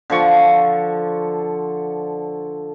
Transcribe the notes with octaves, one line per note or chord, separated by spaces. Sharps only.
D3 F3 C#6